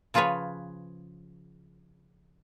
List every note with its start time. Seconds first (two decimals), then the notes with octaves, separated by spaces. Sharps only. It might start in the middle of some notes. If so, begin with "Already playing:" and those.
0.14 C#3 F3 F4 G#4 B4 C#5